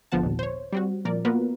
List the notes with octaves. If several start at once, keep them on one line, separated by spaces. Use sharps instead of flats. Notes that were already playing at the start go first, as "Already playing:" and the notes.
G#1 D3 F3 B3 F#5 A5
D#2 A#2
C5 C#5
G3 C4 F#4
A#2 F3 A#4 D5
A#3 B3 F4 F#4 A#4 B4